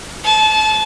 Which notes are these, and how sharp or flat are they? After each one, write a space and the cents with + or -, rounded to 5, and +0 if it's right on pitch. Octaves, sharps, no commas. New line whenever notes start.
A5 -30